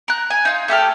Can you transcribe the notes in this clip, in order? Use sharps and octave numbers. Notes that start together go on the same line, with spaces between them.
A#4 F#6
G#5
D#4 F4
A3 G4 A4 F6